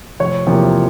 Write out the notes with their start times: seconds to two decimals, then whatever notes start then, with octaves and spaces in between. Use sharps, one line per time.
0.20 F1 C#5
0.47 E2 C3 F3 A#3